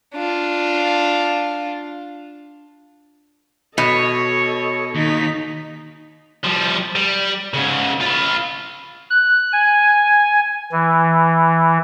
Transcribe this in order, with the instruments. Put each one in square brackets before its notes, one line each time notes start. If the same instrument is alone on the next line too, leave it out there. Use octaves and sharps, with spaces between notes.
[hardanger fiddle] D4 F4
[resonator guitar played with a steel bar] B2 [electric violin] A4 D#5 [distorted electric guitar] C#5
[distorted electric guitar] D#2 [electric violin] D#4 B6
[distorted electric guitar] F3 G3
G3
G#2 C#3
F4 B5
[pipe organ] F#6
G#5
E3